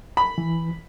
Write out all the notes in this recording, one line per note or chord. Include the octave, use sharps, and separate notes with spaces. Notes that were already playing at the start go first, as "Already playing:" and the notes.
B5
E3